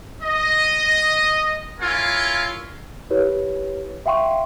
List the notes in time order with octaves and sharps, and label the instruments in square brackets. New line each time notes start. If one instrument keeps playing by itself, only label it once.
[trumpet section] D#5
E4 F4 A#4 C#5 F5 G#5
[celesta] E4 G4 B4 C#5
E5 F5 G5 C6 C#6